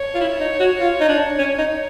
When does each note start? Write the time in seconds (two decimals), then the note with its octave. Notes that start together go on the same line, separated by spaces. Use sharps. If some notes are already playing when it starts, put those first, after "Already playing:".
Already playing: C#5
0.14 F4
0.21 E4
0.40 D#4
0.60 F#4
0.80 F4
1.00 D#4
1.09 D4
1.38 C#4
1.58 D#4